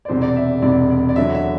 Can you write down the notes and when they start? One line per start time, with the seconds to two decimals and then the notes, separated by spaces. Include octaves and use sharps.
0.05 D5
0.08 E1 E2 C3 C5
0.22 D5
0.36 E5
0.62 E1 E2 C3 D5
0.90 D5
1.09 D5
1.16 E2 D3 F#3 E5
1.35 E5